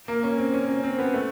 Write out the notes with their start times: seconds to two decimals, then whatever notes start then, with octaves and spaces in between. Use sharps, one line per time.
0.08 A#3
0.23 C#4
0.38 C4
0.54 C#4
0.69 C#4
0.83 C4
0.99 B3
1.14 A3